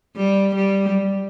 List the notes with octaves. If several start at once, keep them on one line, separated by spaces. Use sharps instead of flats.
G3
G3